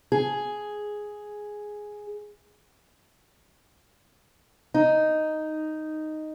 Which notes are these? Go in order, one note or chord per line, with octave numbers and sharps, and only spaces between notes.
G#4
D#4